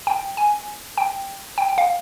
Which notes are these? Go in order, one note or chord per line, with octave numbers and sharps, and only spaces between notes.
G5
G#5
G5
G5
G5
F5